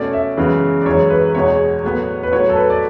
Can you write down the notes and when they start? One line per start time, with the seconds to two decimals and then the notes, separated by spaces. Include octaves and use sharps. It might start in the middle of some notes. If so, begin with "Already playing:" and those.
Already playing: B2 A3 C#4 D5
0.13 E5
0.37 F#2 C#3 E3 G#3 B3
0.81 D5
0.86 F#2 E3 G#3 C#5
1.10 B4
1.35 E2 B2 G#3 C#5
1.83 A2 F#3 B3
2.23 B4
2.31 A2 F#3 B3 C#5
2.50 A4
2.56 B4
2.70 D5